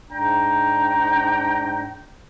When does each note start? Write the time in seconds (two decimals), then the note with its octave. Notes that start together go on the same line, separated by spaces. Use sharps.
0.11 G#2 D4 G5 A#5